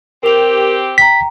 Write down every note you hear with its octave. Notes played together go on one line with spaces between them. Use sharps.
C4 G4 A#4 F7
G5 A#5 B6